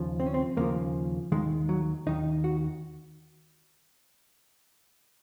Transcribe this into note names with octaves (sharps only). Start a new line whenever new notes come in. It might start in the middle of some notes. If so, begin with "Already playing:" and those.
Already playing: D#2 C#3 F3
C4
C#4
C4
D#2 C#3 F3 A#3
D#2 D#3 G#3
F#3
D#2 D#3 D#4
F#4